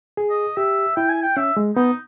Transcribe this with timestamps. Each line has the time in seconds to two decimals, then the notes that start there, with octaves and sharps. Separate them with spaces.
0.17 G#4
0.30 D#5
0.57 G4 E5
0.96 E4 G5
1.09 G#5
1.22 G5
1.37 C#4 E5
1.57 G#3
1.76 B3 D#4